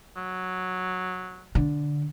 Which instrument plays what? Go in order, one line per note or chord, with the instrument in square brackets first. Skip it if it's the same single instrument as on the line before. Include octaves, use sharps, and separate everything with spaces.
[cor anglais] F#3
[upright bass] D3